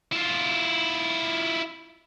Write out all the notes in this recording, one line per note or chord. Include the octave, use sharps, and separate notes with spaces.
E4 F4